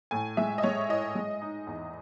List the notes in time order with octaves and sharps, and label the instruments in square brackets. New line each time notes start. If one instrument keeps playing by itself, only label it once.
[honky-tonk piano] A2 G#5
G#3 E5
D#5
G#3 C#5
E4 D#5
G#3
D#4
E2